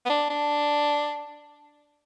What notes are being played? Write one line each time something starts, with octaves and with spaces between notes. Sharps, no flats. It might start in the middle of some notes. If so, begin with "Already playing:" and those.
B3
D4
D4